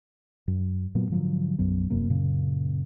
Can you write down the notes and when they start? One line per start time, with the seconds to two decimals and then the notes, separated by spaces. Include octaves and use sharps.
0.48 F#2
0.95 A#2 F#3 B3
1.10 G#2 D3 F3 F#3
1.58 B1 F#2 F#3 B3
1.90 E1 F#2 C3 A#3
2.10 F#2 A#2 C#3